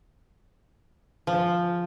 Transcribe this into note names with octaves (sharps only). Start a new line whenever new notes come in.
F3